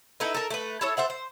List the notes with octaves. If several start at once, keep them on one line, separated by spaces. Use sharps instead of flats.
D#4 E4 A4 B4
A4 A#4
A3 B4
E4 A4 C#5
A4 C5 E5 F#5
C5